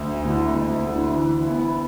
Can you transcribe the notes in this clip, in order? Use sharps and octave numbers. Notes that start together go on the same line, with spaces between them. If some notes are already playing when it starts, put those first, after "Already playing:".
Already playing: D2
D3 A3 E4
D2
D3 A3 E4
E3
B3 E4